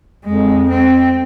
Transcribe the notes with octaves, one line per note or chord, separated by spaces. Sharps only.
F2 G#3
C4